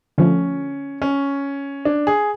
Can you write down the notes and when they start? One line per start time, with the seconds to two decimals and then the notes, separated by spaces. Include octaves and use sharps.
0.18 D3 F3 A3 C#4
1.02 C#4
1.85 D4
2.07 G#4